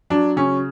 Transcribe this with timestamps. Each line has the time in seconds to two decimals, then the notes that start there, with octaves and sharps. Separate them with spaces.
0.10 F#3 D4
0.36 C#3 C#4